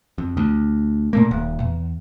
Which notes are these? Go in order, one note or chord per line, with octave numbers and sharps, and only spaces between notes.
F2
D2
A#2 A3 A#3
D#1 A#2
E2